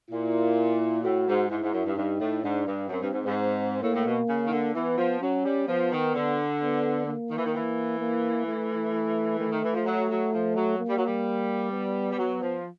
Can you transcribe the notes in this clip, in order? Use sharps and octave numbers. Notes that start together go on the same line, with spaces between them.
A#2 E4
A2 F#4
G#2
G#2 E4
G#2
F#2
G2
G2 D#4
A2
G#2 D4
G2
F#2 C4
G2
G#2
G#2
A2 A#3
A2
B2
C#3
D#3
D3
E3 B3
F3
F#3 C#4
G3
F3 B3
D#3
D3
B3
A#3
D#3
E3
D#3
E3
A#3
A3
D#3 A3
D#3
E3
F3
F#3
F#3
F3
F#3
A#3
G3
F#3
G3
B3
G3
F#3
F3